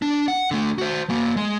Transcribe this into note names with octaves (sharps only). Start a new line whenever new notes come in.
D4
F#5
D3 A3
F#4 C5
A#3 F#4
G#3